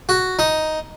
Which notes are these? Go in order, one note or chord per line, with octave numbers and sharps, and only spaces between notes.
F#4
D#4